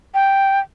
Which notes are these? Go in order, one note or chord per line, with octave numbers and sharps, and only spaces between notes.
G5